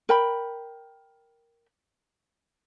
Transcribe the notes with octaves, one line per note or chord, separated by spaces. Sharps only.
A#4 G5 B5